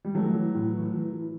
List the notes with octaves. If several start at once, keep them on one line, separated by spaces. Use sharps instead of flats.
G3
E3 F#3 A3
E3
A2
E3
E3
E3